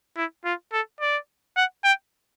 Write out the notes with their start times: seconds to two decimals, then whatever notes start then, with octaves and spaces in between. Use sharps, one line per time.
0.17 E4
0.45 F4
0.72 A4
1.00 D5
1.56 F#5
1.84 G5